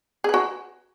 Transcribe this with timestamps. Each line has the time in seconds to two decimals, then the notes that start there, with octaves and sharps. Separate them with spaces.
0.24 G#4
0.29 B4
0.34 F#4